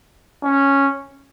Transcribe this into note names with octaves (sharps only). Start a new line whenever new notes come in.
C#4